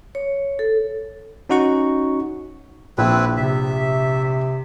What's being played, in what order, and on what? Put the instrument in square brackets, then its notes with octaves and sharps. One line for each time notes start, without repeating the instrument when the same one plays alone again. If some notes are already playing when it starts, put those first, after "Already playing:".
[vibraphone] C#5
A4
[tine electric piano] C#4 D#4 F#4 F#5 C#6
[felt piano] A#1 [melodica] C4 E4 B4
[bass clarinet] C3 [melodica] E5